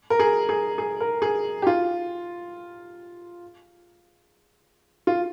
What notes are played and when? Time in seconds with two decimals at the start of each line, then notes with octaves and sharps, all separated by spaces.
0.10 A#4
0.20 G#4
0.49 G#4
0.78 G#4
1.00 A#4
1.22 G#4
1.62 G4
1.67 F4
5.07 F4